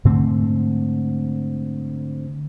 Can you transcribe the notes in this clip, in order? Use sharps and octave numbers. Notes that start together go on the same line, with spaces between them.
G#2 D3 A3 C4